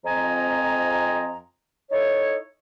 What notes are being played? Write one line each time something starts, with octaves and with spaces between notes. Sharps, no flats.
F2 F3 C4 D#5 G#5 A#5
D#4 E4 A4 C#5